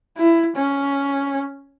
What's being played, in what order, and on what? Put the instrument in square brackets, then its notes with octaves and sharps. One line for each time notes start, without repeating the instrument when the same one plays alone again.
[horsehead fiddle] E4
C#4